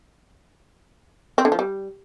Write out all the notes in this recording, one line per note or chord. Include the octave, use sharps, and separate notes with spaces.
C4
D3
F3
G3